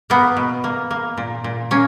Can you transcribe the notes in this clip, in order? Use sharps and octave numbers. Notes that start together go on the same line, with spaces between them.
A#3 B3
B2
A#3
A#3
A#2
A#2
A#3 C#4